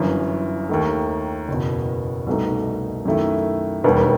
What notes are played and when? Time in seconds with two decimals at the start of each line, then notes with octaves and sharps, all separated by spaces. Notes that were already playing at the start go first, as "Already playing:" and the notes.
Already playing: G1 F#2 E3
0.69 D#2 D#3 A3
1.48 F#1 E2 B2
2.27 C2 B2 A3 D#4
3.05 F#2 D#3 A3 E4
3.84 E1 D#2 D#3 G3 B3